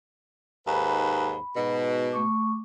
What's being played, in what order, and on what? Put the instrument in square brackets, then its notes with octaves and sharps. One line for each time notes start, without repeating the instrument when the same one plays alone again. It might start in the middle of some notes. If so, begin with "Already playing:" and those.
[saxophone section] D#2 G#2 B4 [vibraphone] B5
[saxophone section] G#2 B2
[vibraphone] A3 C#6 D6